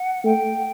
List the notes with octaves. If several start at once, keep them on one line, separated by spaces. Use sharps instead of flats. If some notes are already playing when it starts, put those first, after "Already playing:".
Already playing: F#5
A3 G5